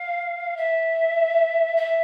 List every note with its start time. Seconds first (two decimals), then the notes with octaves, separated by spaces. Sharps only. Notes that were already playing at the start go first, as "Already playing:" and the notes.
Already playing: F5
0.57 E5
1.77 E5